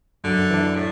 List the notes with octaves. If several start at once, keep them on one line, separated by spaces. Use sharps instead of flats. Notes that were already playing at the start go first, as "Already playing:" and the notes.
F#2 D3
E3 D4
A2